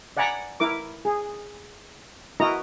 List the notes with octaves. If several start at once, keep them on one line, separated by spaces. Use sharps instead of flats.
D5 F#5 G#5 A#5 B5
E4 A#4 D6
G#4
E4 F#4 A#4 D#5 A#5